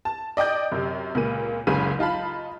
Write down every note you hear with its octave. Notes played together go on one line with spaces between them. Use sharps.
A5
D5 D#5 G5 D6 G6
F#2 C3
C#2 A#2 A#3 D#7
F#1 C#2 C#3 G#4 D#7
D#4 F4 A5 B5